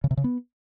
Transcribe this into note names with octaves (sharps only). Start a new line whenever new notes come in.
C#3
C3
C#3
B3